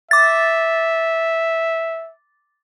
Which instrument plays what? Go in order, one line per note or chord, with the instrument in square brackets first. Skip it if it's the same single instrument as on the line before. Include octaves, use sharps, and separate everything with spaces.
[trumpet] E5 [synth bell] D6 A6